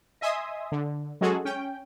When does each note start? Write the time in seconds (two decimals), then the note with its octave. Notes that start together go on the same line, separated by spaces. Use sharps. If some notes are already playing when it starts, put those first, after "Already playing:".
0.21 D#5 E5 G#5 C6 D#6
0.72 D3
1.21 F#3 G#3 C#4 F#4 G#4 A4
1.45 C#4 G5